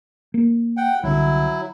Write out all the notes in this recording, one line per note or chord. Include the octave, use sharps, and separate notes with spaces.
A#3
F#5 G5
C2 D3 F#3 E4